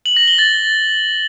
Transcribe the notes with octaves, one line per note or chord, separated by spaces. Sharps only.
F#7
A#6
G7
A6